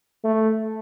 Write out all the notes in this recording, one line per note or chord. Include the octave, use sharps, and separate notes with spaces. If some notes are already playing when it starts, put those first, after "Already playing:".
A3